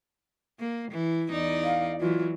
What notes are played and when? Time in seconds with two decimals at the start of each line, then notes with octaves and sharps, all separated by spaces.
0.60 A#3
0.91 E3
1.31 E2 D#4 D5
1.64 F5
2.00 E3 F#3 F4